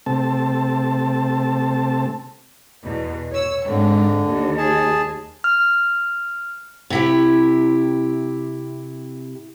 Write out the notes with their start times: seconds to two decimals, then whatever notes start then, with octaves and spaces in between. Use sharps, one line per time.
0.06 C3 A3 C4 A5
2.85 E2 B2
3.30 C#5 E6
3.66 G#1 G#2 D3
4.25 D#2
4.58 G#4 A5
5.44 F6
6.90 C3 E4 G4